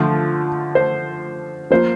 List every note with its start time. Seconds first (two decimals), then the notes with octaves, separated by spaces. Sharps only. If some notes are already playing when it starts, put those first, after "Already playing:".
Already playing: D3 F3 A3
0.75 C5
1.70 F3 A#3 F4 C5